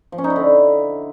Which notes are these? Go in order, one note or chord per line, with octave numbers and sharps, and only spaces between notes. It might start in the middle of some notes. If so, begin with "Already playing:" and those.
F3
C#4
D#4
E4
D3